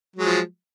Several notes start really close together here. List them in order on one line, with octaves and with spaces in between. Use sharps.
F#3 G#3 F3